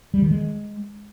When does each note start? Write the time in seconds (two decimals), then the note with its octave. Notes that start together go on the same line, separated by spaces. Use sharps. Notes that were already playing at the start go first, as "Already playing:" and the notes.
0.14 G3
0.22 D#3
0.31 G#3